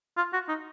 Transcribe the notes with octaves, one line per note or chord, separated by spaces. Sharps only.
F4
F#4
D#4